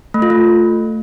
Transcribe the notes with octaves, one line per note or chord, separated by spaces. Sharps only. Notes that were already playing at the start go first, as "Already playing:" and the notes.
A3
F4
A3